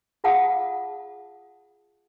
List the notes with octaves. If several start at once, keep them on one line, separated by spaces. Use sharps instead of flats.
F4 G#4 F5 F#5 A5 D#6